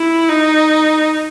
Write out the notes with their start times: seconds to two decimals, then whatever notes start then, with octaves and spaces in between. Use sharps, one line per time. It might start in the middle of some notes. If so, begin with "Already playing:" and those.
Already playing: E4
0.29 D#4